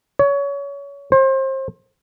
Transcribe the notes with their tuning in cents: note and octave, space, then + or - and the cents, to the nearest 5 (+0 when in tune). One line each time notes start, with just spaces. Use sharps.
C#5 +25
C5 +30